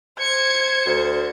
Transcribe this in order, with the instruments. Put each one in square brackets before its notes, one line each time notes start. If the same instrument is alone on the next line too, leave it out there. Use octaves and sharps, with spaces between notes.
[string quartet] C5 [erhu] G#6 [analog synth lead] C#7
[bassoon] D2